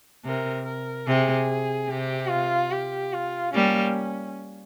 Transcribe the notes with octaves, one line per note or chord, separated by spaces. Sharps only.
C3 A#4
A#4
C3 G#4
C3 G4
F4
G4
F4
G3 A#3 C#4